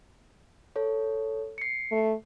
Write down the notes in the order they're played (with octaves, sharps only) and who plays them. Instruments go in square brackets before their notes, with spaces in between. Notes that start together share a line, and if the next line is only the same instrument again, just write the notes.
[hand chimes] A4 C#5
C7 C#7
[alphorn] A3